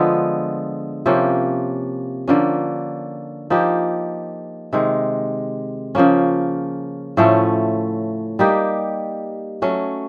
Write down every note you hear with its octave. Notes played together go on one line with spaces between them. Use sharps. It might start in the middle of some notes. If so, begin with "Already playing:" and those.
Already playing: D3 F3 G#3 B3
C3 F3 A#3 C#4
D3 F3 A#3 C#4
F3 A#3 D#4 G4
C3 D#3 G#3
C#3 F3 A#3 C#4
A2 F3 A3 C#4
G3 A#3 D#4 G4
F#3 A3 C#4